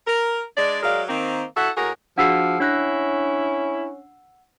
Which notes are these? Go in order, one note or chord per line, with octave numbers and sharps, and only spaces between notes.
A#4
G#3 D4 D5
F#3 G#3 A#4 D5 F5
D#3 A#3 C4
E4 F#4 A4 E5 F#5
A2 F#4 G#4 A#4
F3 D4 F#4 G#4 F#5 E6 C7
C#4 D4 E4 F#6 A#6